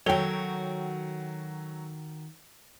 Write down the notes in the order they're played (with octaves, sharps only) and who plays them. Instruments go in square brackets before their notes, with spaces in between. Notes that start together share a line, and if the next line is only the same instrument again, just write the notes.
[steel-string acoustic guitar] D#3 F#4 [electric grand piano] F#3 [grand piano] A4 F7 G7 [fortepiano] C#5 G5